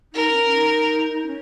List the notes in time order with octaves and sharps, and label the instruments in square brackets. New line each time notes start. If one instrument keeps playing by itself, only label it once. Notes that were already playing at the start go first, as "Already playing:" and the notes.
[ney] D#4 [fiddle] A#4
[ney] C#4
D#4
C#4